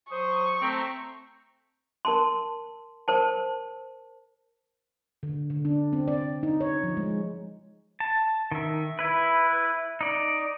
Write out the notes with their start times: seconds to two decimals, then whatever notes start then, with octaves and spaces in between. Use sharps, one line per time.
0.12 F#3 C5 C#6 D#6
0.61 A3 C4 A#5
2.05 A#4 A5 C6
3.08 A#4 C5 A5
5.23 D3
5.50 D3
5.65 D4
5.93 C4
6.08 D5
6.43 D#4
6.61 C#5
6.83 F3
6.97 G#3
8.00 A5
8.52 D#3 E5
8.99 E4 B4
10.01 D#4 D5